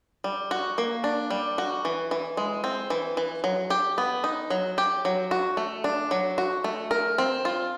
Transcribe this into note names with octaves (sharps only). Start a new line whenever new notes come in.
G3
F#4
A#3
D4
G3
F#4
E3
E3
G#3
C4
E3
E3
F#3
G4
B3
D#4
F#3
G4
F#3
F#4
A3
D4
F#3
F#4
A3
A#4
C4
F4